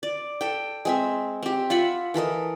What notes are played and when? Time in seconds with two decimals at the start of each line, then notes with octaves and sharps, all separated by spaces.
0.03 D5
0.41 A4 G5
0.85 G#3 C4 E5
1.43 C4 G4
1.70 F4 E5 F#5 B5
2.14 E3 A4 A#4 D#5